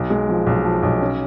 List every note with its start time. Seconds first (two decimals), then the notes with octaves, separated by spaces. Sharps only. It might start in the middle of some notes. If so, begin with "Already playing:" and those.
Already playing: B1
0.10 G#3
0.29 F3
0.47 B1
0.65 F3
0.83 B1
1.01 C#4